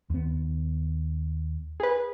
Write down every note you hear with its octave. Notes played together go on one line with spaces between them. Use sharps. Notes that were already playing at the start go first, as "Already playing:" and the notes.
D#2 B3
G#4 B4